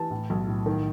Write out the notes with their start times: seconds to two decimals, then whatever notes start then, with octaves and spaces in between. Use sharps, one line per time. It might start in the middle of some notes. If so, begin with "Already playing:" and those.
Already playing: E3 A5
0.11 A2
0.30 B1
0.48 A2
0.66 D#3